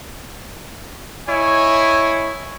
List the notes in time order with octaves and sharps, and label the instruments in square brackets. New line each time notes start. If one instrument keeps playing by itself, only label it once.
[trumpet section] E4 C#5 D#5 G#5